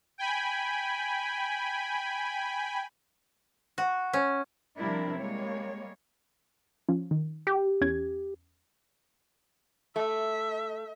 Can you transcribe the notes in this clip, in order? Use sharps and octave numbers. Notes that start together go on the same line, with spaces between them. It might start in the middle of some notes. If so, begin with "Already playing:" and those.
G5 G#5 B5
F#4
C#4
C3 F3 G3 D4 E4 A#4
G3 G#3 A#3 C#5
F3 C#4
D#3
G4
E2 C#4 G#6
A3 E5